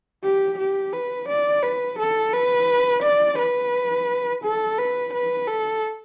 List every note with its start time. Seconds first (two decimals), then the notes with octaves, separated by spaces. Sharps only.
0.23 G4
0.59 G4
0.93 B4
1.29 D5
1.63 B4
1.99 A4
2.33 B4
3.03 D5
3.38 B4
4.44 A4
4.78 B4
5.13 B4
5.48 A4